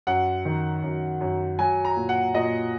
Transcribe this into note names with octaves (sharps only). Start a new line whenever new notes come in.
F#2 F#5
D#3
F#2
F#2
F#3 G#5
A#5
A#2
F#5
A#2 D#5